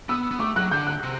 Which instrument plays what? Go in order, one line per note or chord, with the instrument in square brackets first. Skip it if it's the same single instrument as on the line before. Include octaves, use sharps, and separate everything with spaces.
[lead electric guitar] B3 [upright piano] E6
[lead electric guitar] B3
[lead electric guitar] A3 [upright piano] D6
[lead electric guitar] F#3 [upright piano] F#6
[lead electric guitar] D3 [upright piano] G6
[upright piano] F#6
[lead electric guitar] C3